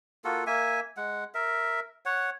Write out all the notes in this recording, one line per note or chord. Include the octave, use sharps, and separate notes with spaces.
A#3 F4 F#4 A4
A#3 E5 G#5
G#3 F#5
A#4 E5
C#5 F#5